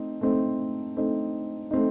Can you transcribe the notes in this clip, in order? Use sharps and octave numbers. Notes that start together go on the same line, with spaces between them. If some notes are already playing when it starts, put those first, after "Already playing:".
Already playing: A3 C4 D#4
A3 C4 D#4
A3 C4 D#4
A3 C4 D#4